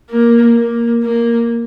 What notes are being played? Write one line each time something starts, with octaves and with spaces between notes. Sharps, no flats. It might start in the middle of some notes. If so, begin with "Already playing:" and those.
A#3
A#3
A#3